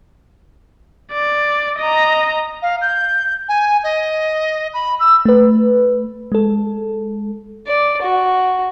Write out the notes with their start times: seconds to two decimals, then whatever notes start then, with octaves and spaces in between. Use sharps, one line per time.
1.13 D5
1.79 D#5 A#5
2.62 F5
2.82 G6
3.48 G#5
3.84 D#5
4.74 B5
4.99 E6
5.25 A3 B4
6.32 G#3 A4
7.67 D5
8.02 F#4